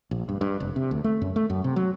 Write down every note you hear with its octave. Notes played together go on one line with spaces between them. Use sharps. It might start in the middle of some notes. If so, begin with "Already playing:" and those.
A#1
G2
G2
F1
C3
D2
A3
F#2
A3
F#2
C3
F#3